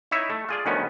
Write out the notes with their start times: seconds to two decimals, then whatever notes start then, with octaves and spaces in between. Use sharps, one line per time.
0.11 D#4 E4 C#5 E5
0.30 A3
0.49 F4 G#4 D5
0.66 D2 D#3 F3 B3 C#4